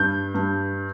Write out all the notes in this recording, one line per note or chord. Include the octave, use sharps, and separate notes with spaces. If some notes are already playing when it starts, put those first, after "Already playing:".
Already playing: G2 G6
G2